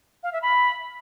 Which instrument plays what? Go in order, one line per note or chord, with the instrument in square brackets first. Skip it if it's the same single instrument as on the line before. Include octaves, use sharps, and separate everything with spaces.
[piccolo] F5
E5
B5